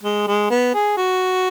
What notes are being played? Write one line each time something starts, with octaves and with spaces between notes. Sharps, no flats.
G#3
G#3
B3
G#4
F#4